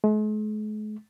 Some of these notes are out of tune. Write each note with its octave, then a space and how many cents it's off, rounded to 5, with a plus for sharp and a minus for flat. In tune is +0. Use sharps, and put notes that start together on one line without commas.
G#3 +45